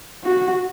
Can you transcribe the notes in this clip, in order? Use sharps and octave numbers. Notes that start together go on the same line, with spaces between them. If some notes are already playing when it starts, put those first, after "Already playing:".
F#4